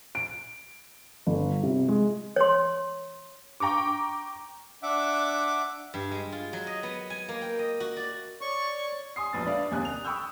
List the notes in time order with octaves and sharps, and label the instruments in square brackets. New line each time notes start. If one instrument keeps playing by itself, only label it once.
[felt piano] D7
G1
C3
G#3
[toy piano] C#5 C6
[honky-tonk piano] G5 A#5 C#6 D6
[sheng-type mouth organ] D4 E5 F#5 D6
[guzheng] G2
G#3
F4
F#3
D#5
B3
G#5
A#3
G5
D#5
F#4
D5
[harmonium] C#5 D5 [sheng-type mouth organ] C#6
[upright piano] G#5 C6 D#6 C7
E1 A#1 B4 D#6 A6
D4 B4 D5 E5 F5
F#1 D#2 C3 G#5 D#6 F#6
F7
G5 B5 C#6 D#6 E6 G6